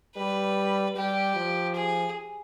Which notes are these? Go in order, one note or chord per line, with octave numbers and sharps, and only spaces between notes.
G3 B4
G3 G4
F3
G#4